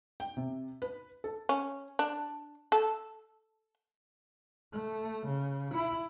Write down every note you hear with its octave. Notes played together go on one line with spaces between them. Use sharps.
G5
C3
B4
A4
C#4
D4
A4
A3
C#3
E4